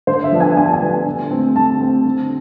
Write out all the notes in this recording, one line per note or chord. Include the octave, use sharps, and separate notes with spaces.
D3 C5
E5
F3 B3 D4
G#5
D3 G#5
A5
G#5
F3 B3 D4
D3
A3 C4
D3 A5
A3 C4
D3